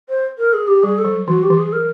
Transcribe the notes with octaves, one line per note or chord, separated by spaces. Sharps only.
C5
A#4
G#4
G4
G3 G#4
A4
F#3
E3 F#4
G4
E3
G#4
A#4